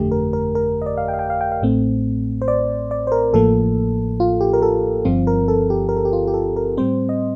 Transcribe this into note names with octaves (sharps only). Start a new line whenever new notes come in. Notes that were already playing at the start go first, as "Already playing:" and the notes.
Already playing: G1 F2 D3 A3 G4
A#4
A#4
A#4
D#5
D5
F5
G5
F5
G5
F5
G5
F5
A1 A2 A3 C4
C5
D5
D5
C5
A#4
A1 A2 F3 A#3 A4
F4
G4
A#4
A4
G1 G2 F3 C4 F4
A#4
A4
G4
A#4
A4
G4
F4
G4
A4
A#4
A2 G3 C4 C5
D#5